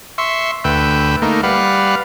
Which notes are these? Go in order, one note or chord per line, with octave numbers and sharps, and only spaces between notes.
E5 C6 C#6
D2 B4 G5 E6
A3 A#3 D#4
G3 B4 F5 F#5